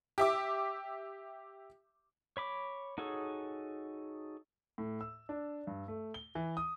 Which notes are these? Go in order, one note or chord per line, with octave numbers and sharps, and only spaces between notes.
G4 E5 D6
C#5 B5 D6
D#4 F#4 G#4 A4 C#5
A2
E6
D4
G2
A3
G7
E3
D#6